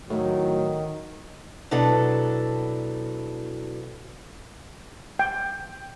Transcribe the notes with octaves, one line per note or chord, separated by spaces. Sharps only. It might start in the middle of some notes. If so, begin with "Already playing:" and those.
A2 D#3 F#3
B2 F#3 D4 E4 A4
G5